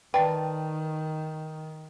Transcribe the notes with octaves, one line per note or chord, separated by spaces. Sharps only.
D#3 B4 D5 G5 A5